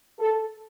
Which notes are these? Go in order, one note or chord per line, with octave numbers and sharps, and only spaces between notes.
A4